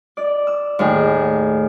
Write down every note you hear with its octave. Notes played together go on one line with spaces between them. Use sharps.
D5
E6
D#2 A2 A3 G#4